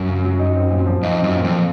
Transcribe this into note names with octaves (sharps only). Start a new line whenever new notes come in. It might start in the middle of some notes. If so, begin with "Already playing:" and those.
Already playing: F#2
C#3
F#3
D#4
C4
A#2
F3
F2 D#4
F#2 C4
A#2
F2 F3